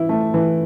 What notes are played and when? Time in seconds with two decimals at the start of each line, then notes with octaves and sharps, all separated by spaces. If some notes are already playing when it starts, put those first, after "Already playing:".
Already playing: E3 E4
0.09 A3
0.34 E3